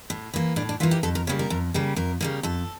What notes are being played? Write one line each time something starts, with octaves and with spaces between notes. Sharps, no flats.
A2
E3 A#3
A2 D4
D4
E3 A#3 F4
G4
F2 A4
A#4
C#3 G3 A#3 C#5
A#4
F2
C#3 G3 A#3
F2 A#4
C#3 G3 A#3
F2 A4